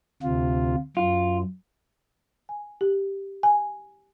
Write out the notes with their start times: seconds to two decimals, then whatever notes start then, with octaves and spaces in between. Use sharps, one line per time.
0.22 D2 C3 F4
0.97 F#2 F4
2.49 G#5
2.81 G4
3.43 G#5